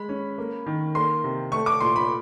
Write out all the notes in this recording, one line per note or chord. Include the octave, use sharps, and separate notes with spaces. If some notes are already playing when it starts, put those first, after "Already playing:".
Already playing: G#3 B5
C#4
A#3
D#3
A#3 C6
C3
A3 C#6
D6
A#2 C6
B5